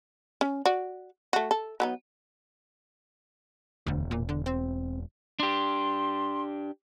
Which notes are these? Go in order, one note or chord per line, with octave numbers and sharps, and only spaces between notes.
C#4
F#4 D5
A3 F#4
A4
F#3 B3 D#4
E1 D2
A#2
D3
C4
D4 G4 C6